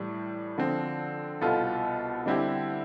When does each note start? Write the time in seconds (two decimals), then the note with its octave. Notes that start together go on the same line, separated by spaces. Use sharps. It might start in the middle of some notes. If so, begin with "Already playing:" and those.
Already playing: A2 E3 G3
0.58 D3 F3 C4
1.41 C2 B2 B3 F4 A4
2.26 D3 G3 C4 E4 G4